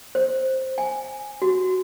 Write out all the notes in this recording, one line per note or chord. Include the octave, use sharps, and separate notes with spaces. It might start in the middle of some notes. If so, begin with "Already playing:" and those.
C5
G#5
F#4